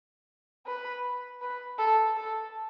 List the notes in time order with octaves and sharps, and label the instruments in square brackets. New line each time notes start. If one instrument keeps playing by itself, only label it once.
[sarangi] B4
B4
A4
A4